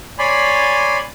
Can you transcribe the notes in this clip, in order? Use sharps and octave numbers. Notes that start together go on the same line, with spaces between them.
C#5 D5 G#5 B5 C6